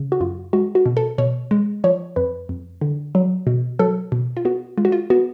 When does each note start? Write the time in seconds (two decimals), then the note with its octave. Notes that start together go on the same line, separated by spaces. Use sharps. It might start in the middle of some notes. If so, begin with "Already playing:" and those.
Already playing: C#3
0.12 F#4
0.20 F#2 F4
0.53 G#3 F#4
0.75 F#4
0.86 B2
0.97 A4
1.18 B2 C#5
1.51 G#3
1.84 F3 C#5
2.16 F2 B4
2.49 F2
2.81 D3
3.15 F#3
3.47 B2
3.79 F#3 A4
4.12 B2
4.37 F4
4.45 B3 F#4
4.78 G#3 F4
4.85 F#4
4.92 F4
5.10 B3 F#4